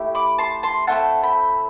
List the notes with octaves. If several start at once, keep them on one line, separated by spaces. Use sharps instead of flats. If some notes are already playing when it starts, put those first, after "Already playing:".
Already playing: A3 E4 G4
B5 D6
A5 C6
A5 C6
A3 C4 E4 A4 F#5 A5
G5 B5